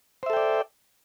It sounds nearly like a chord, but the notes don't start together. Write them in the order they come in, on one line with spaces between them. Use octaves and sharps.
C5 E5 A4 G5 D5